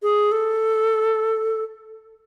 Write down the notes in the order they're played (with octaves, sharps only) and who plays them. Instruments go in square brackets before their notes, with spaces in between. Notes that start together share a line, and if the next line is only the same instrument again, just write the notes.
[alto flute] G#4
A4